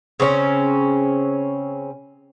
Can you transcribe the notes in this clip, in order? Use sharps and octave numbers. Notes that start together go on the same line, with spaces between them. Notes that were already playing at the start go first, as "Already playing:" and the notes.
C#3 C4 C#4